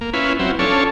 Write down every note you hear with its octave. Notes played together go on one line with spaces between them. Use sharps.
A#3
C#4 E4 F4 B4
F#3 C4 E4
C#4 D4 F4 A4 C#5